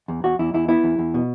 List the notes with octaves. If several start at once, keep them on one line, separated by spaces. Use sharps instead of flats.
E2
E2 F#4
E2 E4
E2 E4
B3 E4
E2
E2
B2